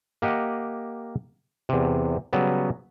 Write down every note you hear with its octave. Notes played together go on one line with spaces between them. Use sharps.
A#3 G4 D#5 F#5
E2 C3
C#3 F#3 G3 B3